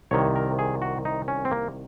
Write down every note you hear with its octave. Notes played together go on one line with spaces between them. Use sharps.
C2 C3 D#3 C#5
A#4
G#4
F#4
D#4
C#4
C4
A#3